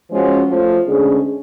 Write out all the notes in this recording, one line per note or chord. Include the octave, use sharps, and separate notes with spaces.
F3 G#3 C#4 F#4
F3 A3 F4
D2 D3 G#3 C#4 G#4